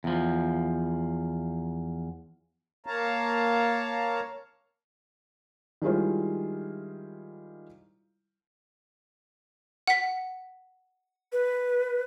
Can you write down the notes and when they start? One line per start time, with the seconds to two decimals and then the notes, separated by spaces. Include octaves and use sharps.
0.04 E2 F3
2.86 A#3 C#5 F5 A5 A#5
5.82 D#3 G3 G#3 E4 F4 C5
9.87 F#5 B6
11.33 B4